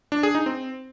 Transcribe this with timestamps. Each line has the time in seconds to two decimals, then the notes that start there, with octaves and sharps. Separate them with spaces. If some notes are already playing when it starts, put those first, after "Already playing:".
0.12 D4
0.23 G#4
0.35 D#4
0.46 C4